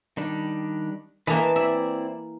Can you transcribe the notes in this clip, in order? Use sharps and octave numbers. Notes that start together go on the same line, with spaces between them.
D#3 G3 D4
E3 A#3 B4 D#5 A5
C4 E4 D5 E5